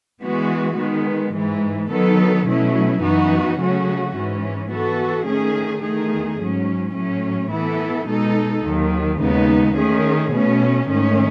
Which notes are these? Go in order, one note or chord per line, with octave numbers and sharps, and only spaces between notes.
E3 G#3 B3 F#4
D#3 G#3 B3
G#2 E3 G#3
D#3 F#3 B3 D#4 A4
B2 F#3 A3 C#4 E4
F#2 E3 B3 D#4 F#4
C#3 F#3 A3 C#4 F#4
G#2 E3 G#3 C#4
E3 B3 F#4 A4
D#3 A3 C#4 G#4
E2 D#3 A3 D#4 G#4
G#2 F#3 C#4
A2 F#3 A3 C#4
E3 B3 E4 A4
B2 G#3 D#4 A4
D#2 D#3 F#3
D#2 C#3 G#3 B3 D#4
D#3 A3 C#4 G#4
B2 A3 C#4
G#2 D#3 A3 C#4